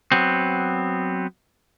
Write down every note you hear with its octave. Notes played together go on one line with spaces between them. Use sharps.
F#3 B3 C4